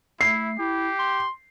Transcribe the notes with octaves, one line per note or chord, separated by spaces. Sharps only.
A3 E4 C7
E4 G4
C6